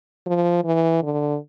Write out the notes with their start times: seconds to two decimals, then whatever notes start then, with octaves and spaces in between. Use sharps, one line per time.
0.26 F3
0.64 E3
1.03 D3